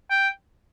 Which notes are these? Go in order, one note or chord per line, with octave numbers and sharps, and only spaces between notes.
G5